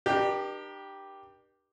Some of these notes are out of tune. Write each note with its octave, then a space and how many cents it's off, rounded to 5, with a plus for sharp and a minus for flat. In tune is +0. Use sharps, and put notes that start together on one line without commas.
D4 +45 G4 +0 A#4 +45